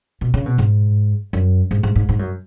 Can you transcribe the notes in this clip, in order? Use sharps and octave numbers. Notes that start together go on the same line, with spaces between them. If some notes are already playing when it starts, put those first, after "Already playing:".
B2
C#3
B2
G#2
F#2
G#2
G#2
G#2
G#2
F#2